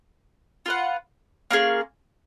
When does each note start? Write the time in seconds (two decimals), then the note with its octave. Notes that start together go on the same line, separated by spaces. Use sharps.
0.66 F4 B4 F#5
1.51 A#3 C#4 F4 G#4